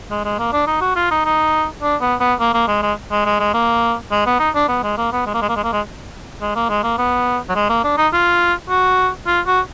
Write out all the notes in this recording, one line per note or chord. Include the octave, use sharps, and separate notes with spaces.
G#3
G#3
A#3
D4
D#4
F#4
F4
D#4
D#4
D4
B3
B3
A#3
A#3
G#3
G#3
G#3
G#3
G#3
A#3
G#3
B3
D#4
D4
B3
G#3
A#3
B3
G#3
A#3
G#3
A#3
G#3
A#3
G#3
G#3
A#3
G#3
A#3
B3
F#3
G#3
A#3
D4
D#4
F4
F#4
F4
F#4